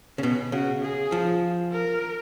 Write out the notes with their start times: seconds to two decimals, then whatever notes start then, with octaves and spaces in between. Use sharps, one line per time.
0.18 C#3
0.23 B2 C#4
0.52 C#3 F#4
0.83 G#4
1.12 F3
1.72 A#4